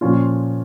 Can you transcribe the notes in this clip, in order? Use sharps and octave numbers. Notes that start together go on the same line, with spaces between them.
A#2 F3 C#4 F4